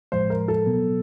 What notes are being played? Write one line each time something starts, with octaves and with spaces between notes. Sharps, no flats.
A2 F3 G#3 C5
A#4
A4
B2 F#3 B3